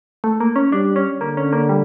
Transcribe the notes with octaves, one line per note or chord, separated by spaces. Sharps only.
A3
A#3
C#4
G3 D4
C#4
D3 A#3
C#4
A#3
G3